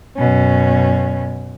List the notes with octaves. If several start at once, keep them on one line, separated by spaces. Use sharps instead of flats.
F#2 B2 C#4